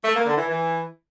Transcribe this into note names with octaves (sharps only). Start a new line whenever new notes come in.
A3
A#3
D3
E3
E3